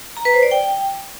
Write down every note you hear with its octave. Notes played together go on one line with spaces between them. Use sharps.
A#5
B4
C5
D5
G5